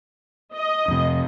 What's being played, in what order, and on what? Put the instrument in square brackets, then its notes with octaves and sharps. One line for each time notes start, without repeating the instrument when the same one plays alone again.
[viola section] D#5
[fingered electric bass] F2 C3